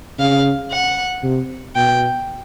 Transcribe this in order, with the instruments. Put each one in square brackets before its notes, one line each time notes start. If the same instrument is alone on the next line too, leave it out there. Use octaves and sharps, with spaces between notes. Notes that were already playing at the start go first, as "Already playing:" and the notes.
[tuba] C#3 [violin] F5
[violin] F#5
[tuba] C3
[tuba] B2 [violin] G5